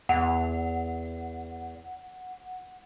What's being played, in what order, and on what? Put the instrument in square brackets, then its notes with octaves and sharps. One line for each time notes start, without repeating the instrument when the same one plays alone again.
[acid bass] E2 [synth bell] F#5